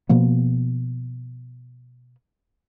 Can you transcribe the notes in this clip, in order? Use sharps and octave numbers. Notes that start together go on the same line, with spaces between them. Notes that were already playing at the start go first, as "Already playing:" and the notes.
B2 F3 A#3 B3